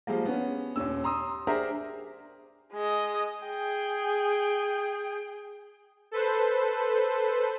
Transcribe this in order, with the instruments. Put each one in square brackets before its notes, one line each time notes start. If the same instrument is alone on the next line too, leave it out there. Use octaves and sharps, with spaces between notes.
[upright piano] F3 G3 G#3 A#3
B3 C#4
D#2 A#2 C#4 E6
A#5 C6 D#6 E6
D4 G4 G#4 A#4 C5 E5
[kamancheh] G#3 D#5
G#4 G5
[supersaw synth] A4 B4 C5